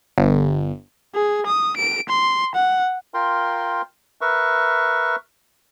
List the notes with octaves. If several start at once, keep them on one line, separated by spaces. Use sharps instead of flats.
G1
G#4
D#6
D7
C6
F#5
F4 A#4 G5 C6
A#4 B4 E5 C#6